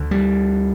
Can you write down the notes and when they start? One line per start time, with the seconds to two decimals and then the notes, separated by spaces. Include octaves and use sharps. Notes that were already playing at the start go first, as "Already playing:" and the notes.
Already playing: D2 D3
0.11 G3